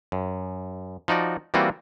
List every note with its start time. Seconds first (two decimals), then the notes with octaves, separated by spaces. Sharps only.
0.12 F#2
1.08 F3 D#4 F#4 D5
1.54 E3 G3 A#3 C4 F4 F#4